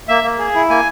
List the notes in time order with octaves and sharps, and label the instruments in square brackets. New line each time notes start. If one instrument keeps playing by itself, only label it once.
[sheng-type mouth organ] A#3 E5
A#3
G#4
E4
A#3 G#5